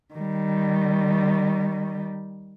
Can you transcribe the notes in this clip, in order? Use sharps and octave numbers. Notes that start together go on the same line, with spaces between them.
D#3 G3